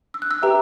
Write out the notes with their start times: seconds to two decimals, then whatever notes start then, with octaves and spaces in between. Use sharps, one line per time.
0.14 E6
0.22 F#6
0.31 E6
0.42 G4 B4 E5 G5 A#5